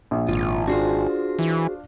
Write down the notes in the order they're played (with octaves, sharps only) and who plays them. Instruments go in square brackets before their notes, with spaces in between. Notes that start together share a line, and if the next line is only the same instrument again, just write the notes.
[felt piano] A#1
[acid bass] G#1 [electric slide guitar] F4
[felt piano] D4 F4 [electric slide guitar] F#4 G#4 C5
[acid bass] E3